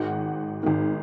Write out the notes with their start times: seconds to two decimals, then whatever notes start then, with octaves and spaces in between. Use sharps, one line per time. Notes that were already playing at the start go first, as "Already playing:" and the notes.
Already playing: G#1 G#2 D#3 F#4 F#5
0.63 G#1 G#2 D#3